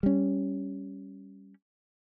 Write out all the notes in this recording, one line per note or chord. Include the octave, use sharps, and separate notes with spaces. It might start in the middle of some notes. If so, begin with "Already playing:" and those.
G3 C#4